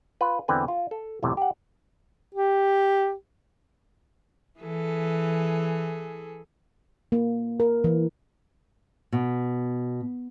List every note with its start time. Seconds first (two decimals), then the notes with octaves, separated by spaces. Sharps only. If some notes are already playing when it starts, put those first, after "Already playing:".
0.21 F4 B4
0.48 E2 D3 C4 B4 G5 G#5
0.68 F4
0.91 A4
1.22 B1 E2 A2 C3
1.37 G4 F#5
2.35 G4
4.59 E3 G#4 A4
7.12 A#3
7.60 A#4
7.84 E3
9.12 B2